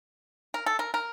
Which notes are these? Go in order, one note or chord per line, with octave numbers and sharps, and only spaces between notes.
A#4
A4
A#4
A#4